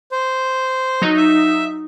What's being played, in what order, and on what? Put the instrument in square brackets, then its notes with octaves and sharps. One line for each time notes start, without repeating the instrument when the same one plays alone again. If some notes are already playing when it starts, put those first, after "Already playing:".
[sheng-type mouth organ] C5
[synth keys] F#3 D#4
[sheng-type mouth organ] E5